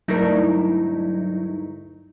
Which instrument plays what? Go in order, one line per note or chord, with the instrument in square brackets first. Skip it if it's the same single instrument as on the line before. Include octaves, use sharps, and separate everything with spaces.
[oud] D2 G2 A#4 [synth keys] F#3 D#4 E4